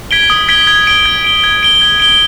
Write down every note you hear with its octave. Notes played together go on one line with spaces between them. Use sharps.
G#6 B6 D7 G7
D#6
G#6 B6 D7 G7
G#6
D7 G7
G#6
D7 G7
G#6
D7 G7
G#6
D7 G7